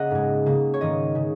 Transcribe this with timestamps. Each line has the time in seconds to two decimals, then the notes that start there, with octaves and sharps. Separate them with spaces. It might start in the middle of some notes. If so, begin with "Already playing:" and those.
Already playing: C#3 A#3 D#5 F#5
0.11 G#2 G#3
0.46 C#3 A#3
0.74 C#5
0.81 G#2 D#3 A#3 D#5
1.15 C#3